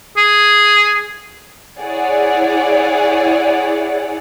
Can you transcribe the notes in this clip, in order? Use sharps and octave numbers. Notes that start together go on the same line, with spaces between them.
G#4
E4 G#4 C#5 D5 F#5